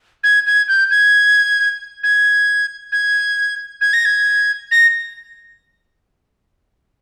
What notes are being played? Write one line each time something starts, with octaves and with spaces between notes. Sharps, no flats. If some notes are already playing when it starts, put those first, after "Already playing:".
G#6
G#6
G6
G#6
G#6
G#6
G#6
A#6
G#6
A#6